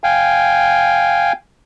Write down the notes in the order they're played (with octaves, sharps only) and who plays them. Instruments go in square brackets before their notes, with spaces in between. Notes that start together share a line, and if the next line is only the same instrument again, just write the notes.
[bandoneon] F5 G5 G#5